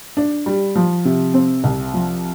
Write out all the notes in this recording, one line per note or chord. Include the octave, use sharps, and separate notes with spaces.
D4
G3
F3
C3
C4
C2
F3